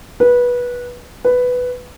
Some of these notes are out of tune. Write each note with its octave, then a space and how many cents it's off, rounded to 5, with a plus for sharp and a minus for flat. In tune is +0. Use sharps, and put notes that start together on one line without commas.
B4 -20
B4 +5